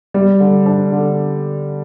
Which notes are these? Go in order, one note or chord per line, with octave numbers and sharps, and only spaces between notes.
G3
D3
D4
D3